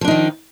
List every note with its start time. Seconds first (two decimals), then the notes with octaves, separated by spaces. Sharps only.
0.01 F3
0.04 D4
0.08 D#4
0.11 D#3